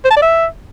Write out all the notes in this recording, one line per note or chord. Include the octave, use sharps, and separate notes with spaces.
C5
A5
D5
E5